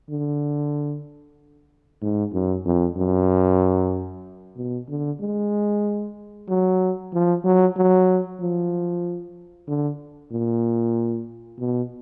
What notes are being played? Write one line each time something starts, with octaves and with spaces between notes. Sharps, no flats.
D3
G#2
F#2
F2
F#2
B2
D3
G#3
F#3
F3
F#3
F#3
F3
D3
A#2
B2